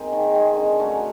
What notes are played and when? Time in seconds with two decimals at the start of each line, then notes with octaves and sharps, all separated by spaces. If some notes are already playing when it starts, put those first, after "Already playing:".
Already playing: G#3 A#3 C4 D#4
0.12 D#3
0.35 G#3 C4
0.56 D3
0.79 F#3 A3 C#4